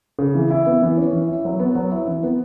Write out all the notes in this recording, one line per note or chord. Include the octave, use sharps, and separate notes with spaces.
C#3
E3
E4
B3
E3
C#4
E3
E4
F#3
B3
F#3
E4
E3
B3